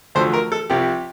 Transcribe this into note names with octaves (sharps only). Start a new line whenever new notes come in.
D2 D3 F3 A3 C5
A#4
A4
C2 C3 F3 G4